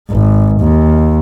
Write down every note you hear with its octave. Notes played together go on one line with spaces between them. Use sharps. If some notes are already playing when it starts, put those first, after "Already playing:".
G#1
D#2